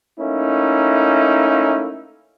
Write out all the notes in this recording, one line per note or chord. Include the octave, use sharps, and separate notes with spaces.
A3 A#3 C#4 D#4 E4